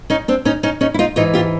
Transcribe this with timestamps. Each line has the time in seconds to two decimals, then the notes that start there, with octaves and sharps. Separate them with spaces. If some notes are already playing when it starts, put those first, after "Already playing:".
0.10 C#4 D#4
0.28 C4 D4
0.45 C#4 D#4
0.63 C#4 D#4
0.81 C#4 D#4
0.94 E4
0.99 D#4 F4
1.16 G#2 E3 D#4 F4
1.34 F4 G4